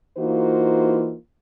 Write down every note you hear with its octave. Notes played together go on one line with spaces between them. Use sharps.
E3 A#3 D#4 F4 F#4 C5